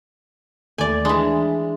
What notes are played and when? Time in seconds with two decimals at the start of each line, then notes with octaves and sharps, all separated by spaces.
0.78 D#2 A3 D5 G#5
1.05 E3 G#3 D4